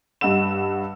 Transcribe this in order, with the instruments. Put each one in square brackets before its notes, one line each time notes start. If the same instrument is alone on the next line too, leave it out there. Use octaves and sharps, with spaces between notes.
[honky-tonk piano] G2 D#5 F#5 E6 E7